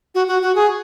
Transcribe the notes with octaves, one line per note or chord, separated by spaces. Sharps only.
F#4
F#4
F#4
G#4